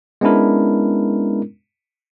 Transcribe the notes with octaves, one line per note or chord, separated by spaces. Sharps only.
G#3 B3 C#4 D4 E4 A#4